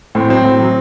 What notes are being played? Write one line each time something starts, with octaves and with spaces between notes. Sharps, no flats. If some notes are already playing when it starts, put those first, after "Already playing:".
A2 C4
F#3 C4
A2
F#3